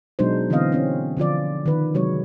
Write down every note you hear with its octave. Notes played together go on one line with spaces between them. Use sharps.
B2 F#3 G#3 D4 D#4 C5
D3 E3 B3 C4 D#5 F5
C4 C#4
D3 F3 F4 D5
D#3 B4
C3 F#3 G#3 C#5